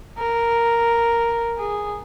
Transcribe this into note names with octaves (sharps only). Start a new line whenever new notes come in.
A#4
G#4